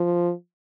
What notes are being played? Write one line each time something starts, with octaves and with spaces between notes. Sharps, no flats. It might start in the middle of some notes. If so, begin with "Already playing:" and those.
Already playing: F3